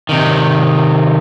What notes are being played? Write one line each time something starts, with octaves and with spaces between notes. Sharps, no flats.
C3 D#3